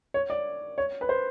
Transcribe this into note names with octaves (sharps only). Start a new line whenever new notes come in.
C#5
D5
C#5
B4
C5